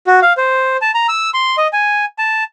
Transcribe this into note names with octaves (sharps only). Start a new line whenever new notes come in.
F#4
F5
C5
A5
A#5
E6
C6
D#5
G#5
A5